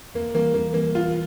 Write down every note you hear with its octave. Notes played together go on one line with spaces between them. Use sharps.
E2 A#3
E3 G3 A#3
E2 A#3
E3 G3 A#3
E2 F4